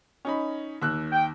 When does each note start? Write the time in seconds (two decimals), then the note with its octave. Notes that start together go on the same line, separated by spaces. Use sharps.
0.25 C#4 D#4 B5
0.82 D#2 E6 F#6
1.12 G5